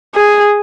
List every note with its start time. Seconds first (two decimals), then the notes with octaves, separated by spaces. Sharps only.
0.15 G#4